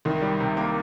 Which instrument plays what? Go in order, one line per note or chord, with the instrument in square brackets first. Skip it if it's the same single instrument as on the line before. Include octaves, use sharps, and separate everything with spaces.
[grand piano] C2 [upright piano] D#3
[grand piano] G3
C3
A#3